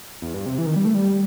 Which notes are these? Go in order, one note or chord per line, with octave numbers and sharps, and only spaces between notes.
E2
G2
C3
E3
D#3
G3
A3
G3